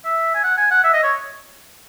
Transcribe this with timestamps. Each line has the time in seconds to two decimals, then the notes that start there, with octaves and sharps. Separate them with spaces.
0.05 E5
0.35 G#5
0.44 F#5
0.57 G#5
0.71 F#5
0.84 E5
0.93 D#5
1.03 C#5